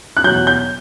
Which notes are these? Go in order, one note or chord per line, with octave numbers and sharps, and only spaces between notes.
F#6
E2 B2 F#3 G6
G6